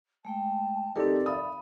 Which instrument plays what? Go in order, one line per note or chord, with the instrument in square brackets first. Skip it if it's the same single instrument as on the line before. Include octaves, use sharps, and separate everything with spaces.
[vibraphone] G#3 A3 G5 [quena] A5
[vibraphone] C4 A#4 [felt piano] D#4 G4 A4 [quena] D5
[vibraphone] E5 F5 B5 [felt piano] D#6